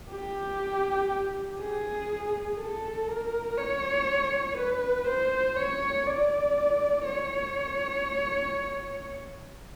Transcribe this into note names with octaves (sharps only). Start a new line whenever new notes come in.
G4
G#4
A4
A#4
C#5
B4
C5
C#5
D5
C#5